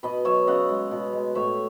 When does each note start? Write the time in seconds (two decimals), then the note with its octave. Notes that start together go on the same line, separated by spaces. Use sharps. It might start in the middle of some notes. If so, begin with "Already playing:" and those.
0.03 B2 B4 D#5
0.25 F#3 C#5 E5
0.47 C#3 D#5 F#5
0.69 G#3
0.91 B2
1.13 G#3
1.35 A2 C#5 E5